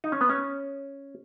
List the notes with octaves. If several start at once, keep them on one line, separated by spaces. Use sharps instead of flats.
D#4
C#4
B3
C#4